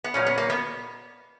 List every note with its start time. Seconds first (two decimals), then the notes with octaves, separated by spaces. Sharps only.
0.04 B3
0.14 A#2 F#3 C#4
0.26 B3
0.38 A#3
0.50 B3